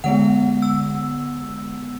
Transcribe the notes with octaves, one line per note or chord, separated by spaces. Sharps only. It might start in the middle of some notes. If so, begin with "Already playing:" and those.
D3 G#3 B3 F#5
E6